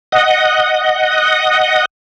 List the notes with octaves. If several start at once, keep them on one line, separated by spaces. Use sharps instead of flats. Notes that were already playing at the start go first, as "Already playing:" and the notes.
D#5 F#5